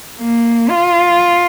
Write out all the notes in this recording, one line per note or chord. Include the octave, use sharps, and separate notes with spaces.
A#3
F4